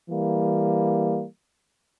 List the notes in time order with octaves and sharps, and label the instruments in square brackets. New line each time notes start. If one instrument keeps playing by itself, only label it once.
[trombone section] E3 G3 A#3